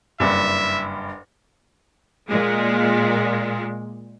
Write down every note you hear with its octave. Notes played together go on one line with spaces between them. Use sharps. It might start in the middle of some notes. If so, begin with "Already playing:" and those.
F#1 G2 E5
A#2 G#3